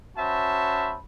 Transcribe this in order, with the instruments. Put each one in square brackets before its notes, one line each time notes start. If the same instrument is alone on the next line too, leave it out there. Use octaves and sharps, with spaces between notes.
[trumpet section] C#4 F#4 C5 E5 A5 B5